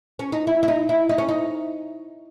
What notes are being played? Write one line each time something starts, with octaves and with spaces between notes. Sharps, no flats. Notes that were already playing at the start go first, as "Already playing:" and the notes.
C#4
D#4
E4
E4
D#4
E4
D#4
C#4
D#4